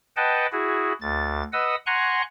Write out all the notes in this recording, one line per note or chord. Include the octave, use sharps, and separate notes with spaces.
B4 D#5 F#5 G5 A5
E4 F#4 G#4
D2 A6
B4 D#5 F#5 D#6 E6
F#5 G#5 A#5 C6 C#6 F#6